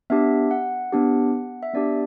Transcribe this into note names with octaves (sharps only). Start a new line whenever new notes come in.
B3 D4 G4 E5
F#5
B3 D4 G4
E5
B3 D4 G4 D5